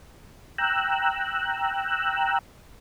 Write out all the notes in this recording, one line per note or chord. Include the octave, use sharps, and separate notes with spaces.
G5 A#5 E6 F#6